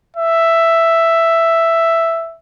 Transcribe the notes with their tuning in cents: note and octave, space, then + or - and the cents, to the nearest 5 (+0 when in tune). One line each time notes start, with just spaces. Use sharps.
E5 +5